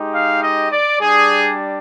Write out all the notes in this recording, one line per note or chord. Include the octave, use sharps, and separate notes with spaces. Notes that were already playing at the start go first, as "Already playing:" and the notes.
Already playing: G#3 D#4 G4
F5
D#5
D5
G3 D4 G4 G#4